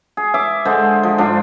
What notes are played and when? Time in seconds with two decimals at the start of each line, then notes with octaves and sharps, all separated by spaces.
0.17 G#4
0.34 E5 D6
0.65 D3 G#3 C5
1.03 F3
1.18 G#2 F3 D4